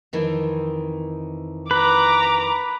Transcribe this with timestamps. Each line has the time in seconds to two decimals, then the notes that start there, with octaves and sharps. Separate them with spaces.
0.13 F2 D#3 E3
1.71 B4 A#5 D6